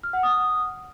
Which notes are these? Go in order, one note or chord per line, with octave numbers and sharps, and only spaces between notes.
F6
F#5
D#6